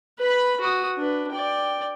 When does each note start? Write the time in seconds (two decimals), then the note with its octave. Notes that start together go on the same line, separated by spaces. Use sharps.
0.19 B4 B5
0.60 F#4 D#6
0.98 D4 B4
1.32 D5 G5